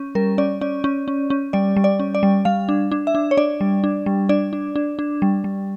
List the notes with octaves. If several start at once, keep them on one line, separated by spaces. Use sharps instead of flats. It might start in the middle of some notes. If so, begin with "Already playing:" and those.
Already playing: C#4
G3 A#4
C#4 D5
C#4 D5
C#4
C#4
C#4
G3 D5
G3
D5
C#4
D5
G3
G3 F5
D4
D4
E5
D4
C#5
D4 D5
G3
D4
G3
D4 D5
D4
D4
D4
G3
G3